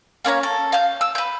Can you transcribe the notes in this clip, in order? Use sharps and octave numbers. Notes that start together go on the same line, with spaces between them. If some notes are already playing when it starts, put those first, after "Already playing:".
A#3 C#4 C#5 A#5
A4
F5 G6
E6
B4 G6